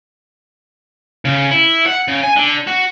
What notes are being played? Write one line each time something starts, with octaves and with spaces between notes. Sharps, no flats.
C#3
E4
F#5
C#3
G#5
D3
F#4